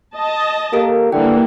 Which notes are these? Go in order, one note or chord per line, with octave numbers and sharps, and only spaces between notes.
D#5 A5
A#3 G4 A4 A#4
D3 E3 G3 A#3 G5